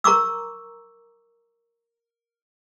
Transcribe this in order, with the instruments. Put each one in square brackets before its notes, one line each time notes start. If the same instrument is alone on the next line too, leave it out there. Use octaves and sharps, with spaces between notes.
[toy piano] A#4 A#5 C#6 D6 E6